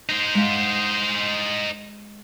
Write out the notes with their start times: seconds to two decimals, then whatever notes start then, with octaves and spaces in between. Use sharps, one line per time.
0.09 D#4 C5
0.35 G#3 F5 F#5